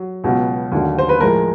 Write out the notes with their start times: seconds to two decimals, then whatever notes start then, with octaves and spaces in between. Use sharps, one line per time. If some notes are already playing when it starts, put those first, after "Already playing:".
Already playing: F#3
0.24 C#2 B2 F#3
0.72 D#2 D3 F#3 A3
0.98 C5
1.09 B4
1.20 A2 F3 G#3 A#4